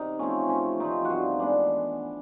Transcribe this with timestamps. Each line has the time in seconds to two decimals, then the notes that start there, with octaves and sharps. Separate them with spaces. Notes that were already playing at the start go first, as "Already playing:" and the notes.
Already playing: C3 D#4
0.19 F3 A3 C4 C#4
0.49 C3 C#4
0.80 F3 A3 C4 D#4
1.05 G2 F4 F#4
1.39 E3 G#3 B3 D4